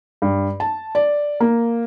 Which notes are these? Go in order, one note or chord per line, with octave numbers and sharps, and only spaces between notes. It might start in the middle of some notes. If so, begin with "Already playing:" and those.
G2
A5
D5
A#3